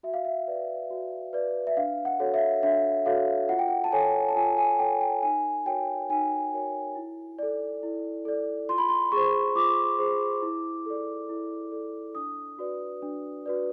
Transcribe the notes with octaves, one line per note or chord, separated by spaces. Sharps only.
F#4 E5
F5
E5
B4 D5
F#4
B4 D5
E5
D4 F5
F#5
F#4 A4 C#5
E5
D4 E5
F#4 A4 C#5 F5
F4 F#5
G5
F#5
A5
A4 C#5 G#5
A5
F4 G#5
G#5
A4 C#5 G5
G5
D#4 G#5
F#4 A#4 C#5 G5
D#4 G#5
F#4 A#4 C#5
E4
A4 D5
E4
A4 D5
F4 C6
B5
C6
G#4 C5 C#6
F4 D6
G#4 C5
E4
A4 D5
E4
A4 D5
D4 D#6
F#4 B4 D5
D4
F#4 B4 D5